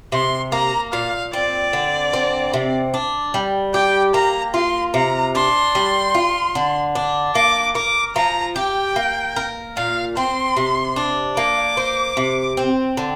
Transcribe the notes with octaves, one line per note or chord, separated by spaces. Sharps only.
C3 C6
A#3 A#5
A#2 F5
C4 D5
D3
C4
C3
D4
G3
G4 G5
A#3 A#5
F4 C6
C3 A#5
D4 C6
G3
F4
D3
D4
A#3 D6
A#4 D6
F3 A#5
G4 G5
A#3
A#4
A#2 F5
C4 C6
C3
D4
A#3 D6
C5
C3
C4
D3